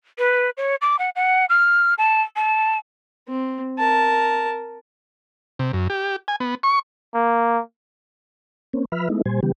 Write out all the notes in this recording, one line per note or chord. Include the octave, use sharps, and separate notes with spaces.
B4
C#5
D6
F#5
F#5
F6
A5
A5
C4
A#4 A5
C3
F#2
G4
G#5
B3
C#6
A#3
A#3 C4 C#4
F3 B4 E5 B5 F6
G#3 A3 B3 D#4 E4
A#2 G3 C5 G#5
C#3 E3 G3 B3 G4